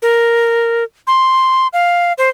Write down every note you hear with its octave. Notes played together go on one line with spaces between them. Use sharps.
A#4
C6
F5
C5